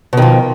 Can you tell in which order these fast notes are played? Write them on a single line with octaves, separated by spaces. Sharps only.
B2 D#3 F3